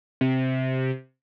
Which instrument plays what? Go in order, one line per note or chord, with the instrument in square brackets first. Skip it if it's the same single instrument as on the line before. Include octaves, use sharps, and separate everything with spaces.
[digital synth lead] C3